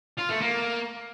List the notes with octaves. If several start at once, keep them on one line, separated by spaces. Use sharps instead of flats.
F4
A3
A#3